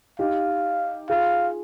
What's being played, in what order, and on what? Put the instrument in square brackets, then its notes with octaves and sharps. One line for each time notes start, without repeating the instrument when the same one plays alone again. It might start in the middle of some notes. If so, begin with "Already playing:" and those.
[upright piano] D#4 G4 [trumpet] F5
[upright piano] F4 G#4 [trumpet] F5